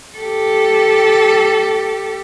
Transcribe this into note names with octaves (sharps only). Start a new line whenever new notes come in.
G4 A4